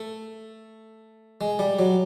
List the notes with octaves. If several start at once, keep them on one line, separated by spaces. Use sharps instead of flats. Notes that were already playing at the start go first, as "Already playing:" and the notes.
Already playing: A3
G#3
G3
F#3